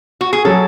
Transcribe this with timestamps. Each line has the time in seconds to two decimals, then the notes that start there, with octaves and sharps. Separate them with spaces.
0.21 F#4
0.33 G#4
0.45 F#3 C#4 G#4 A4